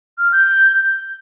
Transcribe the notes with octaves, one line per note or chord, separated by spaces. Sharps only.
F6
G6